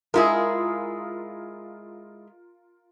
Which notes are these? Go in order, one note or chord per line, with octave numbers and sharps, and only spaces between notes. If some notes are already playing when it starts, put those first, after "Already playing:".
G#3 E4 F4 G#4 A#4